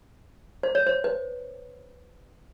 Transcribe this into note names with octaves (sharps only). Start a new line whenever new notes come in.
C5
C#5
C5
B4